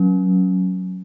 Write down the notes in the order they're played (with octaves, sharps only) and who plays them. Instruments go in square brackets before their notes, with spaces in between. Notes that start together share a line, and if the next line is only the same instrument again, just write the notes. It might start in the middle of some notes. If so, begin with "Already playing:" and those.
Already playing: [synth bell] F#3 C#4